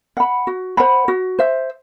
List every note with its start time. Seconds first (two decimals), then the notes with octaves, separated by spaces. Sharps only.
0.17 F#5 B5
0.47 F#4
0.77 C5 F#5 B5
1.08 F#4
1.39 C5 E5